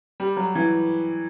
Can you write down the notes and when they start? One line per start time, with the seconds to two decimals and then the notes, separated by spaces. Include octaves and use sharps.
0.20 G3
0.37 F#3
0.55 E3